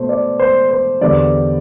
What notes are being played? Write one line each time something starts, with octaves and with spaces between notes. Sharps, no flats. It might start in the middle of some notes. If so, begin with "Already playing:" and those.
Already playing: B2 A3 C5
D5
C5
C5
E2 D3 G3 D5